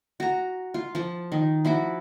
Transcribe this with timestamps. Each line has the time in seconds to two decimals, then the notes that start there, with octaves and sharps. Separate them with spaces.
0.20 F#4 A#5
0.74 F4
0.95 F3 A5
1.32 D#3
1.65 F3 E4 F#4 D6